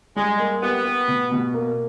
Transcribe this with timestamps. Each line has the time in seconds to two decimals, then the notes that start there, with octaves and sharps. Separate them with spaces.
0.16 G3 G#3
0.39 A#3
0.62 B3 G4
0.85 G4
1.08 B2
1.32 B2
1.54 A#3